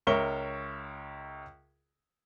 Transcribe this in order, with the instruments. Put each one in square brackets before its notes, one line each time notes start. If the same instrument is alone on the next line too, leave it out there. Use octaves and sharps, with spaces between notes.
[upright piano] C#2 A#4 C#5 E5 C#6 G7